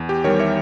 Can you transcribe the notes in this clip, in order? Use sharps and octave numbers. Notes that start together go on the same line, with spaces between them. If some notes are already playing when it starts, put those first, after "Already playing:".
Already playing: E2
G4
D#3 G3 A#4 C#5
C#5 E5